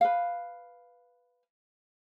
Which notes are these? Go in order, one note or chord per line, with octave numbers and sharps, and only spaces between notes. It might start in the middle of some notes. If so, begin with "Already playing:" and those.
B4 F5